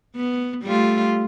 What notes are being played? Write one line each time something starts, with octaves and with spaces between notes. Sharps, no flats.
B3
G3 A3 F4